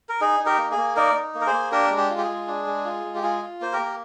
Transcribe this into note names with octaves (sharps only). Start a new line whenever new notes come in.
A#4
D#4 G#4
D#4
G4 A#4
A#3
G#4
A#3
D#4 A#4 D5
D#4
A#3
A#4
G#4 C5
A#3
D4 G4 A#4
G#3
G4
F4
G4
G#4
G#3
D4
G#3
F4
G#3
G4
F4 G#4
F4
A#3 C5
G4 A#4
A#3